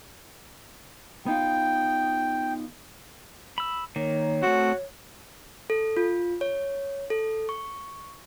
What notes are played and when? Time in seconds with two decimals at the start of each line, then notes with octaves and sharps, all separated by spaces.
1.26 B3 D#4 F4 G5
3.58 B5 E6
3.96 D#3 A#3 C#5
4.43 A3 C4 F#4
5.70 A4
5.97 F4
6.41 C#5
7.10 A4
7.49 C#6